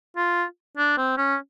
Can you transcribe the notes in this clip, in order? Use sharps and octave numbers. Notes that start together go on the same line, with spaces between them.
F4
D4
C4
C#4